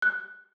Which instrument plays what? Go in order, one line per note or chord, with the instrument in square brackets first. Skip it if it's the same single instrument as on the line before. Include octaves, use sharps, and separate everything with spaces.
[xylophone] F#6